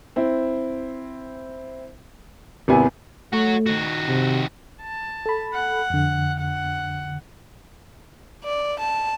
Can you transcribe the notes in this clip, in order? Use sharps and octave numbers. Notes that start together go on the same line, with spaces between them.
C4 E4
G#1 C3 B3 E4 G#5
A3 F#4 C#5
D#3 F#4
C3
A5
A4 B5
F#5
F2 D3
F#5
D5
A5